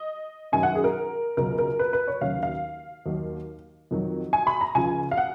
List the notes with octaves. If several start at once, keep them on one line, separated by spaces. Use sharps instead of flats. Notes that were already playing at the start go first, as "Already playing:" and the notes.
Already playing: D#5
F#2 D#3 F#3 G#5
F#5
G#4
A#4
C#2 B2 F#3 A#4
A#4
B4
B4
C#5
D#2 C#3 F#3 F5
F5
D#2 D#3 F#3
F2 D#3 F#3
G#5
B5
A#5
C#2 C#3 F3 G#5
F5
F#5